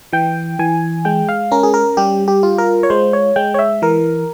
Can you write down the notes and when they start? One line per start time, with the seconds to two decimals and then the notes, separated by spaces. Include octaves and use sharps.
0.13 E3 G5
0.59 E3 G#5
1.05 G#3 G5
1.29 F5
1.51 C#4 A#4
1.63 G#4
1.74 A#4
1.97 G3 G4
2.28 G4
2.43 F4
2.58 A#4
2.83 C#5
2.90 G#3 C5
3.13 C#5
3.36 G#3 G5
3.54 C#5
3.59 E5
3.82 E3 A#4